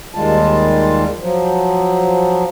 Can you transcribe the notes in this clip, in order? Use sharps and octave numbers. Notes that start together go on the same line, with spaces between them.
D#2 D#3 G3 G#3 F4 A5
F3 F#3